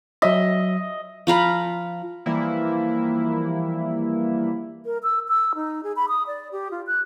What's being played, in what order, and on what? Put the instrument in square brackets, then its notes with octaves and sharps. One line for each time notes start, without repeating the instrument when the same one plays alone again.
[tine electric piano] F#3 E5 [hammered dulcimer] D#5
[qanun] F3 F4 A#5 B5
[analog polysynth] E3 F3 G3 A#3 E4
[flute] A#4
E6
E6
D#4
G#4
B5
D#6
D5
G4
F4
F#6